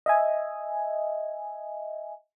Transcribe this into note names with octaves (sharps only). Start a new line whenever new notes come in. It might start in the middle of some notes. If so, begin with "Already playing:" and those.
D#5 E5 G#5